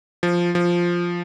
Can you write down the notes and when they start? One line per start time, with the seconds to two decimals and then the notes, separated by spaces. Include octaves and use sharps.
0.23 F3
0.55 F3